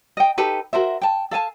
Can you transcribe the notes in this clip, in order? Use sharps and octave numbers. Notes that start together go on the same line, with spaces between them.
D#5 G5
D#4 G4 A4 B4
F#4 A#4 C5 E5
G5 A5
A4 F5 G#5 A5